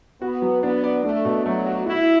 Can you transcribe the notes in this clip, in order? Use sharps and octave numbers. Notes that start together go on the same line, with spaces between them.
B3 F#4
F#3
B3 D4
D5
A3 D4
B2
F#3 A3
F#4
E4 F#4